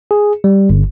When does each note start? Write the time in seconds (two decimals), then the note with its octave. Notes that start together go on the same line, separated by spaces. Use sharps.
0.11 G#4
0.44 G3
0.70 G1